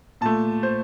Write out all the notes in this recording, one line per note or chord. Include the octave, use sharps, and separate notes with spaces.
A#2 A3 A5
C5